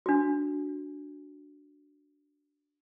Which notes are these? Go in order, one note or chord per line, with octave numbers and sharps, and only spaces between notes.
D4 F#4